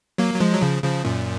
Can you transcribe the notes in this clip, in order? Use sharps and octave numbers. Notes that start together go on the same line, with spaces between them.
F#3 A#3
F#3
F3 G#3
F#3
C#3 F3
C#3 F3
F#2 A#2